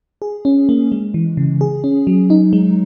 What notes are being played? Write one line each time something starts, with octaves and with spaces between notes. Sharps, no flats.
G#4
C#4
A#3
G#3
E3
C#3
G#4
C#4
F#3
D#4
G#3